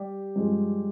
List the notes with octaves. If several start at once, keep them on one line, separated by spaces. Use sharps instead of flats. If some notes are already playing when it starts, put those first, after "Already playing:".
Already playing: G3 G4
G2 F3 G#3